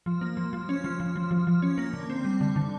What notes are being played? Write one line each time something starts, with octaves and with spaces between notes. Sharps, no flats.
F3
A#3
F3
F3
C#4
F3
F3
F3
F3
F3
C#4
A#3
D3
C4
G3
D3
D3